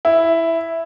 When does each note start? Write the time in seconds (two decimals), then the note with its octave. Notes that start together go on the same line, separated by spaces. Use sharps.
0.05 E4